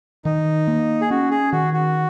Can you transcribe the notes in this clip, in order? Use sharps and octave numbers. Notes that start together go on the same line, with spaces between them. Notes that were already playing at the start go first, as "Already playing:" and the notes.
D#3 D#4
A#3
G#4
C#4 F#4
G#4
D#3 F#4
F#4